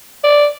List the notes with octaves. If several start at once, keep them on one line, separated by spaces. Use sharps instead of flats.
D5